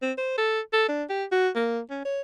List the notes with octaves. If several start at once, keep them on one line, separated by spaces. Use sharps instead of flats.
C4
C5
A4
A4
D4
G4
F#4
A#3
C#4
C#5